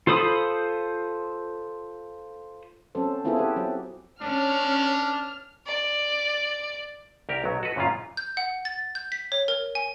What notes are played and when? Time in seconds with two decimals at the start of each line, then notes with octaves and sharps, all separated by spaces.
0.07 F4 A4 C5 B5 D#6
2.95 F#3 C4 C#4 A4 C5
3.24 B3 C4 E4 F4 G#4 A4
3.36 G4 A4 B4
3.56 F#3 C4
4.21 C#4 D4 F6
5.67 D5
7.29 C2 G4 A#4
7.44 B1 F#3
7.63 F#4 A4 B4
7.76 F#2 A#2 C#3 C#4 F4
8.17 G6
8.37 F#5
8.65 A6
8.95 G6
9.12 B6
9.32 C#5
9.48 A#4
9.75 G#5